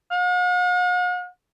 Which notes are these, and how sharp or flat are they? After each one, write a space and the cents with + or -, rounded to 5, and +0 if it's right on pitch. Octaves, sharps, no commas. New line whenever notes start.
F#5 -45